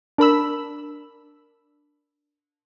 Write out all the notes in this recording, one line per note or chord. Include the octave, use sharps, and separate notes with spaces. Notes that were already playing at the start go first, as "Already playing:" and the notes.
D4 A#4 B5 E6